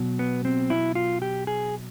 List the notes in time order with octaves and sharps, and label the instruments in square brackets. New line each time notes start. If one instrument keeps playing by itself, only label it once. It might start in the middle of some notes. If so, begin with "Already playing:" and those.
Already playing: [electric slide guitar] B2 F#3
B3
C4
E4
F4
G4
G#4